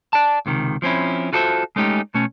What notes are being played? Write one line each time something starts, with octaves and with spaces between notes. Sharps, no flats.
D5 A5
C#2 C3 D#3
F3 C4 C#4 E4
F4 F#4 A4 C5 D5 E5
G#3 A3 C#4 D#4 G4
B2 A3 C#4